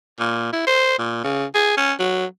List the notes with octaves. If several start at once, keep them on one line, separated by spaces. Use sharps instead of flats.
A#2
E4
C5
A#2
C#3
G#4
C#4
F#3